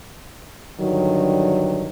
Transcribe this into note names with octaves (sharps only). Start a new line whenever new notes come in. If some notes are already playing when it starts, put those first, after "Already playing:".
G2 D3 D#3 F#3